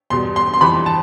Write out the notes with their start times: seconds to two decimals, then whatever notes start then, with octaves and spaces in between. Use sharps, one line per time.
0.10 E2 B2 G3 C6
0.36 C6
0.54 C6
0.61 F2 E3 G3 B5
0.86 A5